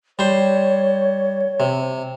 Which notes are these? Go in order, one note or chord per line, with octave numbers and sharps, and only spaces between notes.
G3 C5 C#5
C3